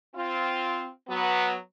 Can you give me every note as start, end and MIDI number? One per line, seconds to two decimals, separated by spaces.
0.15 0.87 60
0.15 0.87 65
1.08 1.55 54
1.08 1.55 59